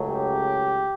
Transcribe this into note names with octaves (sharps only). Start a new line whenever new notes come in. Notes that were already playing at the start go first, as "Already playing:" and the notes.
Already playing: C#2 C#3 F#3 A3
G4